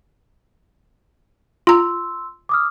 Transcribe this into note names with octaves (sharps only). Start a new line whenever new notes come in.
F4 A#5 C6 E6
D6 D#6 F6